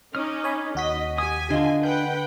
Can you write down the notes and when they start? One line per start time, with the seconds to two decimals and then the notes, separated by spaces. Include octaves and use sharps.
0.15 C#4 D#4 D6 D#6 F6
0.44 C#5 G#5 B5
0.75 D#2 F#4 D#5 B6
1.18 G4 G#5 D#6
1.50 D3 D4 F4 D#5
1.83 B4 F#5 G5 G6